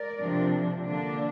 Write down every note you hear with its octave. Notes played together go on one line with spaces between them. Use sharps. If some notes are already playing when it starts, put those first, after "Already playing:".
Already playing: A#4 D5
C3 F3 D4
D3 F3 A#3 D4